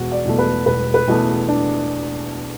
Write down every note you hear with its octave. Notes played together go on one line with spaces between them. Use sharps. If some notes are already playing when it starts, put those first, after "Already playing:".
Already playing: E1 F#4
D5
E2 B2 A3
B4
E1 B4
B4
E2 B2 A3
D4